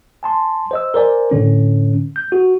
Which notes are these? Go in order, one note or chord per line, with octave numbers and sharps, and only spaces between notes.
G#5 A5 C6
C5 D#5 E6
A#4 C5 D5 G#5
A2 D3 C#4
G6
F#4